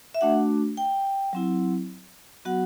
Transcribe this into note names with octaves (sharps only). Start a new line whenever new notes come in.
E5
A3 D4 F#4 F#5
G5
F#3 C4 E4
F#3 B3 F#4 F#5